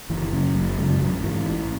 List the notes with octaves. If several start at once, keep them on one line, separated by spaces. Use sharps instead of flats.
F#1 E3
F#2 C#3
F#1 F#3
F#2 C#3 G#3
A1 F#3
G#2 E3
A1